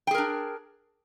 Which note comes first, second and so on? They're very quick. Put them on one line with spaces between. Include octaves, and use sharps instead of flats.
G5 G#4 A#4 D4